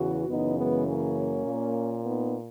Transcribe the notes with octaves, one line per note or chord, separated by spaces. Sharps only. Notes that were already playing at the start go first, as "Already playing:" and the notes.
Already playing: E2 C#3 E3 F#4
F#2 C#3 E3 B3 D#4
G#3 B3
A#3 C#4
A#2
B3 D#4